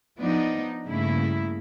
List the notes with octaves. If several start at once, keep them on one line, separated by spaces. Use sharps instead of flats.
F3 B3 D4 D#4
G2 C#3 A3 A#3 E4